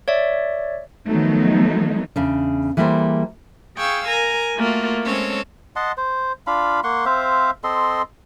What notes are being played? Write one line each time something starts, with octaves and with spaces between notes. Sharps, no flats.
C#5 D5 E5
D#3 F3 F#3 A3 B3 D#4
E2 C#3 D4
E3 G3 A#3 G#4 A4 C5
G#4 F5 G5 C#6 E6
A#4 G#5 A#5
A3 A#3 F4 F#4
G#3 C4 C#4 A4 C#5
D#5 F#5 A5 C6
C5
D4 F4 F5 B5
A#3 F#5 C6 C#6
C4 C5 E5 F5
C4 A4 D#5 C6